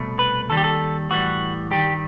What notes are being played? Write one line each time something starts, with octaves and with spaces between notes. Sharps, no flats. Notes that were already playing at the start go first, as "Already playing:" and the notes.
Already playing: C2 B2 A3
B4
D#2 D#3 G3 A4
G4
A4
A2 E3 G3 F#4
G2 D#3 G3 G4